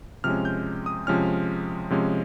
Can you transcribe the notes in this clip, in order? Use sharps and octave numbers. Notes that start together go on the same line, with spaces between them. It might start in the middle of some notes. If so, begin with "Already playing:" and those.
C3 F3 G#3 C#4 F6
G6
D#6
C3 F3 G#3 C#4 F6
C3 F3 G#3 C#4